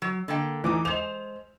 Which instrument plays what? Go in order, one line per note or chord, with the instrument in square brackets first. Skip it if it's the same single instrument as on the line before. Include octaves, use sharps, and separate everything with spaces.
[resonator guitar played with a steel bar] F#3
D3 A#3 G5
[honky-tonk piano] E3 D6 [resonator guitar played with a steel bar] A3 D#4
[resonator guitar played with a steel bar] G#3 C5 [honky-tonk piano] F7